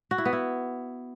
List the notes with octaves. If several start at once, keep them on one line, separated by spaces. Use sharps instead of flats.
F#4
E4
B3
E4